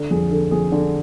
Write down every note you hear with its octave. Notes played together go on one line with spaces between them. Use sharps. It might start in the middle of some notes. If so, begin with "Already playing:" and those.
Already playing: D3
F2 G#4
D3 A4
F2 G#4
D3